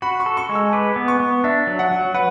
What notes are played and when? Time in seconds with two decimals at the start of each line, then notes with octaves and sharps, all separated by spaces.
0.02 F#4 B5
0.20 C#6
0.26 A4
0.37 C#6
0.49 G#3
0.55 E6
0.73 B4 D6
0.96 B3
1.08 C#6
1.20 B3
1.44 D4 E5
1.67 F#3
1.79 F#5
1.91 F#3
2.14 B4 F#5